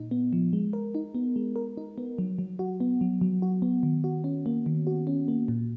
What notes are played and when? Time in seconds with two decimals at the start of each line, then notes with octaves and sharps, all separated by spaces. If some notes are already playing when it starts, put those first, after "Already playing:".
Already playing: A#2 D#4
0.11 B3
0.33 F3
0.53 G#3
0.73 A#4
0.95 D#4
1.15 B3
1.36 G#3
1.56 A#4
1.77 D#4
1.98 B3
2.18 F#3
2.39 F#3
2.59 F#4
2.80 B3
3.01 F#3
3.21 F#3
3.42 F#4
3.62 B3
3.83 D#3
4.04 F#4
4.24 C#4
4.46 A#3
4.66 D#3
4.87 F#4
5.07 C#4
5.28 A#3
5.48 A#2